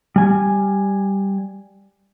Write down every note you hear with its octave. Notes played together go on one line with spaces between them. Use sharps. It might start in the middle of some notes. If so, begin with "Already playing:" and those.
G3 G#5